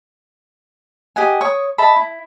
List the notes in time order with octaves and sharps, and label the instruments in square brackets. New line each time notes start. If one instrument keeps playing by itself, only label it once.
[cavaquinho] G4 D#5 F#5 G#5
C#5 C#6 D#6
D#5 E5 A5 B5
E4